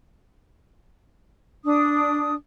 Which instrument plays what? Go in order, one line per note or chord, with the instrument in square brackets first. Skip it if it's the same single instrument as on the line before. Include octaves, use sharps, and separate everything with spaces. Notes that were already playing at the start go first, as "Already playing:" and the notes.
[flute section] D4 D#6